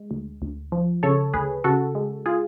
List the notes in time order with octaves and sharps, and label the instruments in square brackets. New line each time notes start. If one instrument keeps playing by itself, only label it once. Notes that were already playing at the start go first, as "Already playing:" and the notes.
Already playing: [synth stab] G#3
D2
D2
F3
C#3 A4 C#5
D2 G#4 B4
C#3 F#4 A4
G#3
F4 G#4